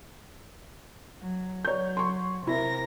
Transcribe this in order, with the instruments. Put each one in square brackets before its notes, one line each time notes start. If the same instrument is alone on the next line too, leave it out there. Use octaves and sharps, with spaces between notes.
[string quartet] F#3
[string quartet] F#3 [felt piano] C#5 G6
[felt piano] C6 C#6
[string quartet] C3 A#4 A#6 [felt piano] E4